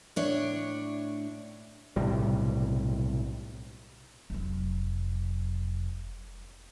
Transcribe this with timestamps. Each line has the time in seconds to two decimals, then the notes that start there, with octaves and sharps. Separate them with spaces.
0.16 A2 D4 C#5
1.96 B1 A2 C3 G3
4.30 F1 F#3